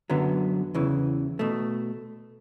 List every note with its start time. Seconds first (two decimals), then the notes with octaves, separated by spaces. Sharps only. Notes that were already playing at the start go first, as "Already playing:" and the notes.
0.10 F#2 D3 F#3 B3
0.74 E2 C#3 E3
1.39 B2 A3